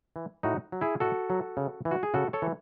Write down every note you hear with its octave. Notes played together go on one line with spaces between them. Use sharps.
E3
A2 D#4 F#4
F#3
E4 G#4
A2 F#4 A4
F#3
C#3
E3
F#4
G#4
C#3 F#4 A4
A4 C#5
E3